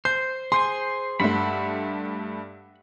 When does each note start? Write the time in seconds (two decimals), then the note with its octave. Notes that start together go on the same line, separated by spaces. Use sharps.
0.05 C5 G6
0.52 G#4 C5 G#5 C6
1.20 G2 A3 E5 F#5 B5